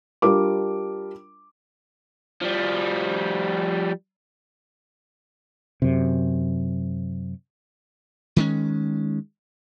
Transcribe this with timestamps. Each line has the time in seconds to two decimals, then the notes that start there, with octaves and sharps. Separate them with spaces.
0.22 G3 D4 F4 A#4 D6
2.41 F3 G3
5.82 F#2 C3
8.36 D#3 G#3 C#4